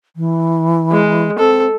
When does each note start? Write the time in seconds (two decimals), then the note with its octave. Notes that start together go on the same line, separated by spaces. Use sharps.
0.16 E3
0.92 G#3
1.39 C4 A4